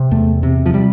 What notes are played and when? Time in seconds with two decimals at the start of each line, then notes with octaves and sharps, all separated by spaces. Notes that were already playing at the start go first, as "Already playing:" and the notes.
Already playing: C3
0.11 E2 A3
0.43 C3
0.66 F3
0.74 G3